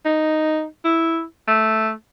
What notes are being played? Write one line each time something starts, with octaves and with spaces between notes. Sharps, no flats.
D#4
E4
A3